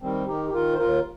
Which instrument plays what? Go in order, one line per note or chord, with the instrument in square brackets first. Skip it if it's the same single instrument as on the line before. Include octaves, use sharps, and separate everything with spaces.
[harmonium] D#3 G3 C4
D#3 D#4 G4
G4
D#3 F4 A#4
C5
D#2 F4 A#4